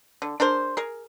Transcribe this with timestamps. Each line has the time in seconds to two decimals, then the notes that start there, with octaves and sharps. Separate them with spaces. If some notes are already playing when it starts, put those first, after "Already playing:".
0.22 D3
0.40 D4 G#4 A#4 C5
0.77 G#4 A#4